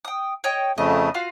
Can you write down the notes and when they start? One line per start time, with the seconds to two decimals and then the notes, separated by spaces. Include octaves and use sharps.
0.05 G5 D#6
0.44 C#5 D#5 G5
0.78 F2 C#3 A3 D#5
1.14 F4 F#4 F5